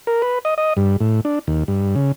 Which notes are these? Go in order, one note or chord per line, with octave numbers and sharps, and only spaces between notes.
A#4
B4
D#5
D#5
G2
A2
D4
D#2
G2
C#3